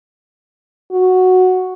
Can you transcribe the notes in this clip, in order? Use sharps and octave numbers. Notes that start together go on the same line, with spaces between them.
F#4